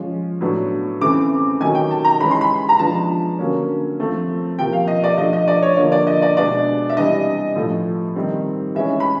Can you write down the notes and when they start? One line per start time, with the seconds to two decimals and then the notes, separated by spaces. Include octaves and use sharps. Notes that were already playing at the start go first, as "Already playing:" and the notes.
Already playing: F3 G#3 C#4
0.41 A2 F#3 B3 D4
1.01 C#3 E3 A3 C4 D6
1.60 D#3 F#3 A3 G#5
1.75 G5
1.91 A5
2.05 A#5
2.20 E3 G#3 C#4 B5
2.31 C6
2.41 B5
2.69 A#5
2.79 F3 G#3 B3 D4 A5
3.39 D3 F#3 A#3 C#4
3.99 F3 A3 C4
4.59 C3 F3 A#3 G5
4.73 F5
4.88 D#5
5.04 D5
5.18 F3 A3 D4 D#5
5.33 D#5
5.48 D5
5.63 C#5
5.77 D3 F3 A#3 C#5
5.92 D5
6.07 D#5
6.22 D5
6.37 B2 G#3 B3 D4 D5
6.90 E5
6.96 C3 E3 G3 B3 D4 D#5
7.56 A2 F3 A3
8.15 D#3 G3 C4
8.75 E3 G#3 C#4 E5
9.00 B5